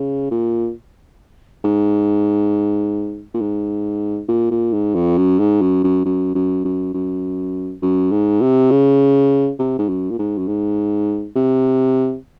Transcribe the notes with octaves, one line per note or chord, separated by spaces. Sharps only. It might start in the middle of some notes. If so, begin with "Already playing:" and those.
Already playing: C#3
A#2
G#2
A#2
G#2
A#2
A#2
G#2
F2
F#2
G#2
F#2
F#2
F#2
F#2
F#2
F#2
F#2
G#2
C3
C#3
C3
G#2
F#2
A#2
G#2
F#2
G#2
C3